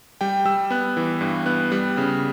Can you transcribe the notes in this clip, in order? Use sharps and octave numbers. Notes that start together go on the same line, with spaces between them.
G3 G5
G3 E6
B3 F#6
E3
G2
B3 F#6
G3 F#6
C#3